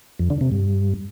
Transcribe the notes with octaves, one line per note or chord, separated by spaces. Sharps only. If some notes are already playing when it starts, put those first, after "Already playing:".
F2
D3
C3
G2